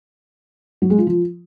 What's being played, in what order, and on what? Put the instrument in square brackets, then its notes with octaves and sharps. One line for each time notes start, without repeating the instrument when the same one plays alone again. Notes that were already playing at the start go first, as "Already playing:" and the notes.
[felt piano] F#3
G#3
F4
F3